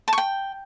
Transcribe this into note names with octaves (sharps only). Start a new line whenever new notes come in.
A5
C#6
G5